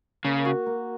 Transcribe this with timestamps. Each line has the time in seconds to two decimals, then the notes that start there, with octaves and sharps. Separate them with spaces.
0.25 C#3 A#3
0.45 F#4
0.66 A#3